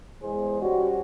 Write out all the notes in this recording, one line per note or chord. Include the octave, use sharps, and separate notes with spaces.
E2 G#3 G#4 C5
G3 C#4 F#4